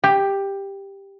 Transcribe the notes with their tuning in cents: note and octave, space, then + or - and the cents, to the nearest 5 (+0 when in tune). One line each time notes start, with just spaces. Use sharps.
G4 +10